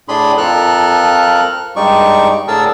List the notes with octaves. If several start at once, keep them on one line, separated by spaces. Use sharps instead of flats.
A2 D4 G#4 B5 C6
F2 F3 A4 A#4 F6 F#6
G2 G3 G#3 D#4 D5 C#6
A2 D3 G#4 A#4 A5 E6